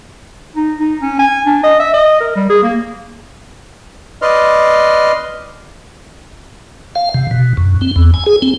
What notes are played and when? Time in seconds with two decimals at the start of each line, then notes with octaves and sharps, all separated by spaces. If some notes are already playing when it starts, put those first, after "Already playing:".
0.56 D#4
0.79 D#4
1.02 C#4
1.19 G#5
1.46 D4
1.64 D#5
1.80 E5
1.94 D#5
2.20 A#4
2.36 G3
2.50 G#4
2.63 A#3
4.22 B4 D5 D#5 C6 F6
6.96 F5
7.14 C3
7.31 B2
7.57 F#2
7.81 C4
7.96 E2
8.14 G#5
8.26 G#4
8.42 C4